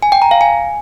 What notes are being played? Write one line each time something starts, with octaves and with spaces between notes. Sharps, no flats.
G#5
G5
A#5
F5
G#5